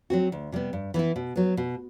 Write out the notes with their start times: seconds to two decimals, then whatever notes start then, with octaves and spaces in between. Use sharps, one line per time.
0.10 F#3 C4 F#4
0.32 D2
0.52 C3 G3 B3
0.73 G2
0.94 E3 B3 E4
1.16 B2
1.36 F#3 B3
1.57 B2